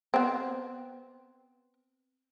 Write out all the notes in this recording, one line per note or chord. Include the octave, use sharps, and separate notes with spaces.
B3 C4